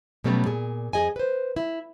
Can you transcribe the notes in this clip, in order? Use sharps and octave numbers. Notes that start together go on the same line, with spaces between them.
B2 F#3 G3 A3 B3 C#4
A#2 G#4
F2 G#4 D#5 G#5
B4 C5
E4